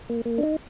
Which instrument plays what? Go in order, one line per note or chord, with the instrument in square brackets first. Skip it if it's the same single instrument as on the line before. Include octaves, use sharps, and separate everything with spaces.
[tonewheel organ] A#3
A#3
D4
D#4